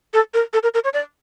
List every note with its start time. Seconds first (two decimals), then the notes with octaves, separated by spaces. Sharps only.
0.14 A4
0.34 A#4
0.53 A4
0.63 A#4
0.74 A#4
0.84 C#5
0.94 D5